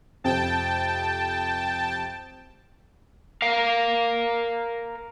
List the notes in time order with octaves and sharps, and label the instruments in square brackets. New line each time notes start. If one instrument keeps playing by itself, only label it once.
[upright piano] F2 C3 [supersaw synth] G5 A5
[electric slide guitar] A#4 F5